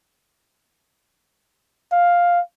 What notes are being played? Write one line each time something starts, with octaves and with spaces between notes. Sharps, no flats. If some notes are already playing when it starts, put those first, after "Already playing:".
F5